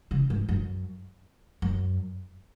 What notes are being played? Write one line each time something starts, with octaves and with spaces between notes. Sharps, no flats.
C#3
G#2
F#2
F#2